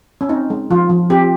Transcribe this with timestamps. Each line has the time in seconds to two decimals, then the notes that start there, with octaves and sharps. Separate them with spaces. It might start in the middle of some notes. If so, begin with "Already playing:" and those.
0.21 C#4
0.29 C4 D#4
0.50 G#3
0.70 F3 F4
0.89 F3
1.10 C4 G4